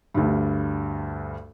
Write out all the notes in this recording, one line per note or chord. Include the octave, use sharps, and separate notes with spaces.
D2 G2